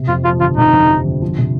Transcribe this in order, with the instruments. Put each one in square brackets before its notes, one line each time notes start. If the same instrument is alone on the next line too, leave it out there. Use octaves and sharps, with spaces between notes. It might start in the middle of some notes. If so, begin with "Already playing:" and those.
Already playing: [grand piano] C3
[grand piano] F2 [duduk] F4
[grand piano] F3 [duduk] F4
[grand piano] G1 [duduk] F4
[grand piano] C3 [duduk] D#4
[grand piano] F2
F3
G1
F3
C3